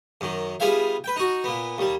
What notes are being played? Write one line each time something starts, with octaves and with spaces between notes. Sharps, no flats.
F#2 D#3
G3 B3 F4 G#4 E5 F5
B4 G5
D#4 F#4
A#2 B3
D#2 G3